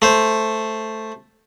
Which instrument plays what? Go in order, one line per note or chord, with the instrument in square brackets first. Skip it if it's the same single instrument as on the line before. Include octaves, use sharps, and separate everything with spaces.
[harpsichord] A3 C5